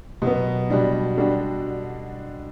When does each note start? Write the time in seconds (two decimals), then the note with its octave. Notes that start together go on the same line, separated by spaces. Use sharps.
0.22 B2 F#3 B3
0.70 B2 G3 D4
1.17 D3 G3 D4 F#4